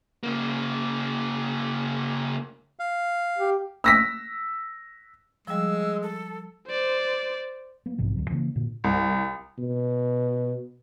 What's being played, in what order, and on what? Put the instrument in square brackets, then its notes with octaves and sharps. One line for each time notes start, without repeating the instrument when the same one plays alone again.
[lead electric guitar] C#3 A#3
[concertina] F5
[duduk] G4
[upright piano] E6 A#6 B6
[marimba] F3 G3 [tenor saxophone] G#3 [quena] E6
[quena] A4
[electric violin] C5 D5
[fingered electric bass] F#3 A#3 B3
A#1 G#2 C3 E3
D2 F#3
C#3 E3 G#3 A#3
A#2 D3
[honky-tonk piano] C2
[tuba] B2